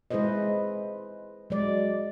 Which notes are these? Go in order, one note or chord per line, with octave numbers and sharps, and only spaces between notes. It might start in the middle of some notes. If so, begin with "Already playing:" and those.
G#3 E4 G#4 B4 C5 D#5
F#3 G#3 D5